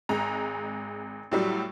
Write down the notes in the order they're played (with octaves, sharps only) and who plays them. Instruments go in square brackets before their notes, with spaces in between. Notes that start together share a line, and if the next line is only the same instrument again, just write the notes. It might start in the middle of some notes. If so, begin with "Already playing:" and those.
[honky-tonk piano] G#1 G#3 A#5
A2 F#3 G3